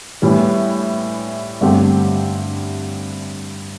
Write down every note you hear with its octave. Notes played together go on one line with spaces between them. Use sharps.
A2 E3 G3
G2 D3 A3 C4 G4